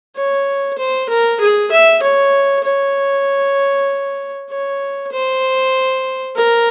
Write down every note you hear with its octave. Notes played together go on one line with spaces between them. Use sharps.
C#5
C5
A#4
G#4
E5
C#5
C#5
C#5
C5
A#4